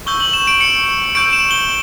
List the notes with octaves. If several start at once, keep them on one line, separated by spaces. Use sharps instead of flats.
C#6 E6 G6 G7
F#7
E7
D7
C#7
C#6 E6 G6 D7
E7
G7